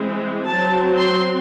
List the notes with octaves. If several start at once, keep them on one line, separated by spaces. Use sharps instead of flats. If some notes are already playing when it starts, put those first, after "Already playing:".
Already playing: E3 G#3 C4
F#3 C4 A5
C6